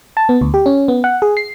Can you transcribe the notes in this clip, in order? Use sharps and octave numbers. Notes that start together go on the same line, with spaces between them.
A5
B3
D2
G4
C#4
B3
F#5
G#4
C7